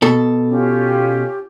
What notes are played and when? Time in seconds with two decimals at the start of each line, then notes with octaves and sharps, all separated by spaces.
0.02 B2 A4
0.49 C#4 F4 G4